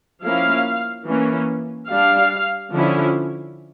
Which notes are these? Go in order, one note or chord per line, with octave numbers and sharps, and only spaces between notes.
F3 A#3 C#4 E4 F5
E3 A#3 C#4
G3 D4 F5
D3 F3 C#4 E4